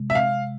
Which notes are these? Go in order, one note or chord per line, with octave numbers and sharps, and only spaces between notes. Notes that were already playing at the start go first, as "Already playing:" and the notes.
Already playing: C3 G#3
E5
F5